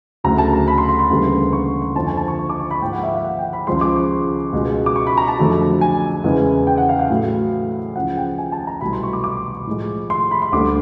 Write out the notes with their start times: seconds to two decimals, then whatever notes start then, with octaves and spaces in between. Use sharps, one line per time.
0.24 D2 C#3 F#3 A3 A#5
0.38 A5
0.53 A#5
0.68 B5
0.78 C6
0.89 C6
0.99 C6
1.10 D2 C#3 E3 G3 A#3
1.53 C#6
1.82 C#6
1.96 F2 D3 F3 A#3 A5
2.07 G#5
2.17 A5
2.28 C#6
2.39 C#6
2.49 D6
2.60 C#6
2.71 B5
2.81 G#2 F3 A#3 G5
2.92 F#5
3.03 E5
3.13 F5
3.24 F#5
3.39 G5
3.53 B5
3.67 C#2 C#3 F3 G#3 C6
3.81 D6
3.96 C#6
4.53 C#2 B2 G#3
4.86 D6
4.96 C#6
5.07 B5
5.17 A#5
5.28 A5
5.39 F2 D3 F#3 A3
5.81 G#5
6.24 E2 C#3 E3 G#3
6.67 G5
6.78 F#5
6.89 F5
6.99 F5
7.10 A2 F#3 A3
7.96 C#2 C#3 F3 F#5
8.17 G5
8.38 G#5
8.52 A5
8.67 A#5
8.81 C2 B2 F#3 A3 B5
8.93 C6
9.03 C#6
9.13 D6
9.24 D6
9.67 A2 F3 G#3
10.10 C6
10.31 B5
10.42 C6
10.52 D2 D3 G3 A#3 D6